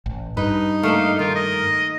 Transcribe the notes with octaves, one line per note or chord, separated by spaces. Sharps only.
A1
G2 D#4 B4
A3 A#3 D4 F5
D#3 F4 A#4
D#5